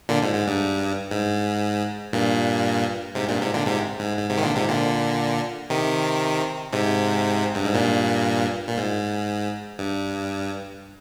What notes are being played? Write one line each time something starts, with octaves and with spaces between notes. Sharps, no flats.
A#2 D3
G#2
G#2
G2
G#2
G2 A#2
G#2 C3
G2 A#2
G#2 C3
A#2 D3
G#2 C3
G#2
G#2
G#2 C3
D#3
A#2 D3
G#2 C3
A#2 D3
C3 D#3
G#2 C3
G2
G#2
G2 A#2
A#2
G#2
G2